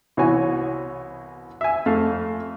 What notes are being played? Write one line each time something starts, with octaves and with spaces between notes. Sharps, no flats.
C2 E3 B3 F#4 C#5 G#5
E5 G#5
F2 A3 F5